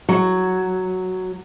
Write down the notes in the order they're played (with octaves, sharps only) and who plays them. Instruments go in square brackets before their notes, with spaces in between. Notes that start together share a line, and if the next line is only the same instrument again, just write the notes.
[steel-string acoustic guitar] F#3